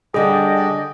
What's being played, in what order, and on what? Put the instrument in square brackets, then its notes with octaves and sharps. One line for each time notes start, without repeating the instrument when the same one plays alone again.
[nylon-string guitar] D3 G3 [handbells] G#4 [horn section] D5 G5 [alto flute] D#5